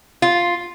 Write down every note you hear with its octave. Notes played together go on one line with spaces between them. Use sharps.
F4